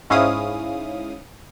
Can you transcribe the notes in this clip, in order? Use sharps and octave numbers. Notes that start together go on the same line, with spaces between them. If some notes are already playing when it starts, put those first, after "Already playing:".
G#2 C#4 E4 F5 D#6